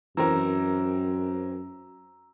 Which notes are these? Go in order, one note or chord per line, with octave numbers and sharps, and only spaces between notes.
F#2 E3 C4 A#4 A#5 E6